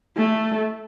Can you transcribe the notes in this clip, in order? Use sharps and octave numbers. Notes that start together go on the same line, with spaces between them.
A3